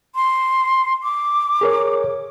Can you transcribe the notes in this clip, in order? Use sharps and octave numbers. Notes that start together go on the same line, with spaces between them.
C6
D6
G#4 A#4 C#5